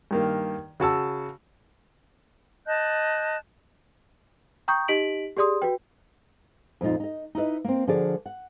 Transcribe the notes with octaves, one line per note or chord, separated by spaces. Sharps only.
G2 D#3 A#3
C#3 F#4 A5 E6
D#5 A5 F#6 G6
G5 A#5 C#6 D#6 G6
D#4 G4 D#5 B6 D7 F#7
G4 G#4 D5 C6 D#6
F#4 B4 G5
F2 A#2 D#4 F4
D#4 D#5
D#4 E4 B4 D#5
A#3 C4
D3 F3 F#4 G#4 A#4 D5
F#5